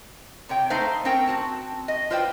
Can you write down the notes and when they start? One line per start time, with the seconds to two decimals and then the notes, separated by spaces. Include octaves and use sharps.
0.49 C3 C#5 G5
0.70 A3 D#4 C5 F5
1.05 C4 C#4 A#4 G5
1.27 C4 F#4 A5
1.88 D#5
2.10 F4 B4 C5 D5 F5 G5